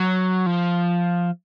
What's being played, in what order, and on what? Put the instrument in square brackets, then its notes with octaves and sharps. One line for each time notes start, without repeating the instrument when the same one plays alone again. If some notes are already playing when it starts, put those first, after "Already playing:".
Already playing: [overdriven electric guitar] F#3
F3